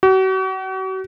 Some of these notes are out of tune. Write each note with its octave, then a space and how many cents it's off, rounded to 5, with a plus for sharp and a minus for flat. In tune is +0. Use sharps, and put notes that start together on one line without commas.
F#4 +40